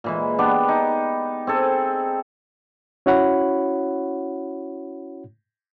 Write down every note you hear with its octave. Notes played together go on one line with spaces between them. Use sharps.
A#2 E3 G#3
B3 D4 G4
D#4
C4 G#4 A4
C#4 E4 F#4 C#5 F#5 B5